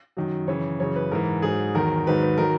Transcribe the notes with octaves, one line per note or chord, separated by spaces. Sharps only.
F#2 D#3 F#3
F#2 C#3 E3 C#5
F#2 C#3 E3 C#5
B4
G#2 E3 A#4
G#2 F#3 G#4
E2 D#3 F#3 A#4
G#2 D#3 F#3 B4
B4
D#3 F#3 A#4